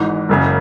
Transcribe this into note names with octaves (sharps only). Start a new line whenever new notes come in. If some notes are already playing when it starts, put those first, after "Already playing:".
Already playing: G#1 G#2 E3
F#1 F#2 C#3